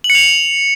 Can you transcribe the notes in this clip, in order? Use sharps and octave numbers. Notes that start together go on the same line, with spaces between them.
F#7
C#7
F7